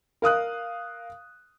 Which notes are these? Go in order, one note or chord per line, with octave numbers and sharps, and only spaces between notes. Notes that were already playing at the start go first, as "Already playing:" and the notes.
A#4 F5 D#6 F#6